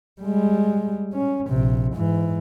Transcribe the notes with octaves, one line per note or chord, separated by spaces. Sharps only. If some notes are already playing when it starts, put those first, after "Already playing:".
G3 G#3
C#4
A#1 C3
G#2 E3